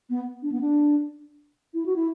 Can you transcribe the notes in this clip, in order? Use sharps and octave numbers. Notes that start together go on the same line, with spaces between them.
B3
D4
B3
D4
E4
F#4
E4